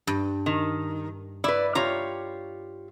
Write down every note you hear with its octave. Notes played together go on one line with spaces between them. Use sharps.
G2
D#3
E4 B4 D5
F4 G4 C#5 A#5